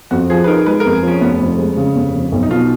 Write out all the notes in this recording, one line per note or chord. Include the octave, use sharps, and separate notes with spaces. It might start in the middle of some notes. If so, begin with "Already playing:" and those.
F2 F#4
F3 G#4
B4
D#4 A#4
G#3 B4
A#4
F2
G#4
F3 C#4
F1 B3
F2
G#3
C#3
F1
F2
B1
D#4
B2 F4